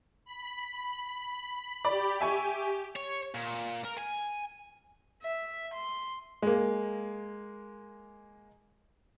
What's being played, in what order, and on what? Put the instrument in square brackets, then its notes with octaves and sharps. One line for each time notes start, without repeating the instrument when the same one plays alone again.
[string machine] B5
[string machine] G4 [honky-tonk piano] D5 B5
[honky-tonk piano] E5 G#5 C#6
[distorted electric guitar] C#5
A#2
A#4
G#5
[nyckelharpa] E5
C6
[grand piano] G#3 A#3